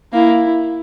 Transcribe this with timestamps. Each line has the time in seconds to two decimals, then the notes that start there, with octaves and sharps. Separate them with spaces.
0.13 A#3 E4